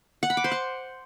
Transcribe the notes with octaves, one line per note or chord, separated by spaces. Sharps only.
F#5
B5
D6
C5
F#5